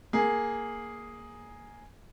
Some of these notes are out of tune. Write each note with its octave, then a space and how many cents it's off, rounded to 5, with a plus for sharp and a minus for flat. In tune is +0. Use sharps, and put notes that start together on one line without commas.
A#3 +0 G#4 +0